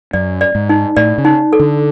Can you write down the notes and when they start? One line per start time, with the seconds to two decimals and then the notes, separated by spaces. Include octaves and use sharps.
0.13 F#2 D5
0.41 D5
0.55 G#2
0.69 D#4
0.96 A2 D5
1.18 C#3
1.25 D#4
1.53 A4
1.60 D3